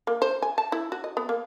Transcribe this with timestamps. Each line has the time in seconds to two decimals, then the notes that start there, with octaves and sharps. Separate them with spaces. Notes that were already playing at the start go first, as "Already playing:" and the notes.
0.07 A#3
0.22 C5
0.42 G#5
0.58 A5
0.72 E4
0.92 F#4
1.04 D#5
1.17 B3
1.29 A#3